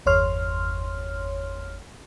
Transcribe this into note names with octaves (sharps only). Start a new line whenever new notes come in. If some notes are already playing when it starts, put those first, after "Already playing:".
G1 E2 C#5 C6 F6